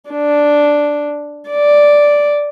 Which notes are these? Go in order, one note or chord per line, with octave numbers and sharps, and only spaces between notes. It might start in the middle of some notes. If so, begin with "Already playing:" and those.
D4
D5